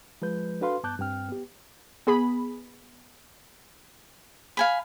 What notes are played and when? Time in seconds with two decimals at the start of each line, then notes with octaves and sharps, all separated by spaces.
0.22 F3 G#3 B4 G6
0.61 D4 F#4 A4 B4 F5 C6
0.84 G2 B3 A5 D6 F#6 G6
0.99 G2 C4 G5 F6
1.29 B3 G4
2.07 B3 G#4 B5
4.57 F5 G#5 B5